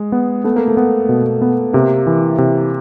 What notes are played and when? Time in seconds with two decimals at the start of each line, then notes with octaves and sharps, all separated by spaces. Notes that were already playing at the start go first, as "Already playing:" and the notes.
Already playing: G#3
0.12 B3
0.44 A3 B3
0.56 A#3
0.68 A3
0.77 B3
1.09 B2
1.42 B3
1.73 C3 A#3
2.07 E3
2.38 C3